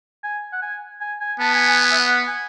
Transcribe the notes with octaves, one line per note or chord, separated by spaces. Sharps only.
G#5
F#5
G#5
G#5
G#5
B3 A5
G#5
G#5
G#5
E5
F#5
G#5